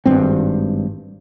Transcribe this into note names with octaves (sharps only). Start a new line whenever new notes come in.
G#1 G2 C4